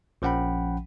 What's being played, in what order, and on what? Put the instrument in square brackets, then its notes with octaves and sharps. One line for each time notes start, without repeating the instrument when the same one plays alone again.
[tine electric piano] A#1 F3 C#4 F#5 G5 B5